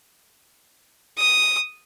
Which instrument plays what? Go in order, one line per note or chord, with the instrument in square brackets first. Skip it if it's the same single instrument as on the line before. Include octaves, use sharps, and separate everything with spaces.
[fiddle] D#6